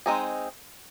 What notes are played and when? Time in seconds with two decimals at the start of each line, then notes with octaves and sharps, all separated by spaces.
0.06 G#3 C4 D#4 G#4